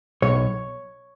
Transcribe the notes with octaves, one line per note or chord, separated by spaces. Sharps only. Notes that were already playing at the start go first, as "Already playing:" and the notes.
B1 C#5